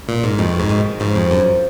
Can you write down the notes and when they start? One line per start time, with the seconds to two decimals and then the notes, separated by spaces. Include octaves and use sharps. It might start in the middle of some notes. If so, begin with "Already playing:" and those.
Already playing: C#3
0.08 A#2
0.24 G#2
0.38 F2 B2 D#3
0.59 G#2
0.69 B2 D#3
1.00 G#2 C#3 F3
1.15 F2
1.31 F#2